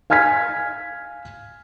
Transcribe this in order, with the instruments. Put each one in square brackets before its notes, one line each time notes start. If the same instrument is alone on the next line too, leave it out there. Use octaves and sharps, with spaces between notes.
[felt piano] F5 G#5 F6 G#6 B6